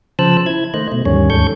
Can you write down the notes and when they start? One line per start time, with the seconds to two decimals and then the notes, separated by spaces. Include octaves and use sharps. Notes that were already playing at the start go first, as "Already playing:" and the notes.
0.19 C#3 F3 C5 A5 E6 F#6
0.46 E4 G#6
0.74 D#3 A3 C5 D#5 F#6
0.92 B2 A3
1.05 D2 G2 D#3 G3 C#4 C#5
1.30 D#2 G#2 A4 C#6 G6